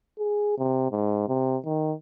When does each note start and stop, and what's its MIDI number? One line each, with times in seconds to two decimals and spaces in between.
0.19 0.57 68
0.58 0.87 48
0.92 1.23 44
1.28 1.57 48
1.65 1.92 51